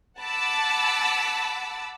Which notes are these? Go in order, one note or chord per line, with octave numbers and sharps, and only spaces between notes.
F#5 A5 B5 D6 E6